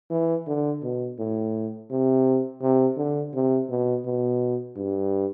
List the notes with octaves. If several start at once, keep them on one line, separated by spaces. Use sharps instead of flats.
E3
D3
B2
A2
C3
C3
D3
C3
B2
B2
G2